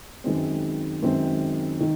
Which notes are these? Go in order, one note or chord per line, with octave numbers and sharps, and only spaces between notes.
F#2 D#3 G#3 C4
F#2 D#3 G#3 C4
D#3